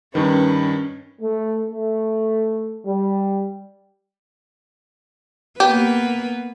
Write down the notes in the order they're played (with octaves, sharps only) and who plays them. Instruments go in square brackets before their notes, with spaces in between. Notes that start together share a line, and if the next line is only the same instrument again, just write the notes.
[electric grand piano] G2 D#3 [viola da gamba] C#4 [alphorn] B4
[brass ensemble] A3
A3
G3
[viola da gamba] A#3 B3 B4 [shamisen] G4